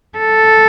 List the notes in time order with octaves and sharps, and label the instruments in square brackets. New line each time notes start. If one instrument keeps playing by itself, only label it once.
[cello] A4